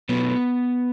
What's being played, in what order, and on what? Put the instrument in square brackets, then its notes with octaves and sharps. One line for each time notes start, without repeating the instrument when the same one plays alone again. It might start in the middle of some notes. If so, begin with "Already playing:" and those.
[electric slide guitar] B2 F#3 A3 B3